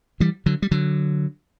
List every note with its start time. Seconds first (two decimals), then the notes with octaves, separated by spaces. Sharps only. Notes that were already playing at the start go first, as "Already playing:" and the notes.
0.20 E3 G3
0.46 D3 F#3
0.62 G3
0.71 D3 F#3